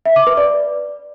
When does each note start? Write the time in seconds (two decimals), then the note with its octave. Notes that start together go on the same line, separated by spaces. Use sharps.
0.06 E5
0.16 D6
0.27 B4
0.37 D5